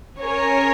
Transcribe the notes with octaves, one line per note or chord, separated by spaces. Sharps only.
C#4 G#4 A#4 C#5